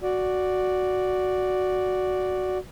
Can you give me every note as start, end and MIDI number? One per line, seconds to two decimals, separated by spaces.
0.03 2.58 66
0.03 2.58 74